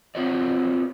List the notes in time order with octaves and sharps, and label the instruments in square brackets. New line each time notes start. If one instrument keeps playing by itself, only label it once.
[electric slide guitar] C4 F4 F#4 B4 C#5 D5